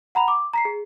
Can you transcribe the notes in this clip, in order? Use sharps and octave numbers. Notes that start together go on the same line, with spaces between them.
F#5 A#5 B5 F7
D6
A#5 B6 C7
G#4